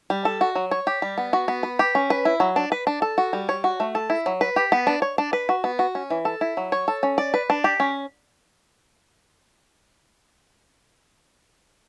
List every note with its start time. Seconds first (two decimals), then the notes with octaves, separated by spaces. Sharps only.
0.10 G3
0.25 A4
0.41 F#4
0.55 F#3
0.71 C#5
0.87 G4
1.02 G3
1.18 B3
1.33 F#4
1.48 B3
1.63 B4
1.79 G4
1.95 C#4
2.10 B4
2.25 E4
2.40 F#3
2.56 D4
2.72 B4
2.87 D4
3.02 A4
3.18 F#4
3.33 G3
3.49 C#5
3.64 F#4
3.80 A3
3.95 A4
4.10 E4
4.26 F#3
4.41 B4
4.56 G4
4.72 B3
4.87 D4
5.02 C#5
5.18 D4
5.33 B4
5.49 F#4
5.64 B3
5.79 F#4
5.95 C#4
6.10 E3
6.25 A4
6.41 E4
6.57 F#3
6.72 C#5
6.88 A4
7.03 C#4
7.18 D5
7.34 B4
7.50 D4
7.64 G4
7.80 C#4